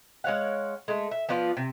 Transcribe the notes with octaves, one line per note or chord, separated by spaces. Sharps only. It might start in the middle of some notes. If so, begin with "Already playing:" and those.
G#3 C#5 F5 F#5
G#3 A3
E5
F3 B3 F4 D5
C3